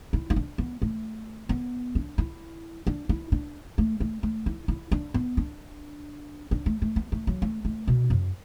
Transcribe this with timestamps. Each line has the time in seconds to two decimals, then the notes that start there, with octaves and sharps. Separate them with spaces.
0.13 E4
0.30 E4
0.36 D4
0.58 B3
0.82 A3
1.49 B3
1.95 D4
2.18 E4
2.87 D4
3.09 E4
3.32 D4
3.78 A3
4.00 A3
4.23 A3
4.46 E4
4.68 E4
4.92 D4
5.14 B3
5.37 D4
6.51 D4
6.66 A3
6.82 A3
6.96 B3
7.12 A3
7.27 F#3
7.42 A3
7.65 A3
7.87 B2
8.10 F#2